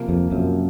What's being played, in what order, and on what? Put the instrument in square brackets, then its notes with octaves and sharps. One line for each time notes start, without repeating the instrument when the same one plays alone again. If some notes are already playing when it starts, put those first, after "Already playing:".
Already playing: [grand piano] C3 F3 A#3
[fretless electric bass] F2
[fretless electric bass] F#2 [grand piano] C3 F3 A#3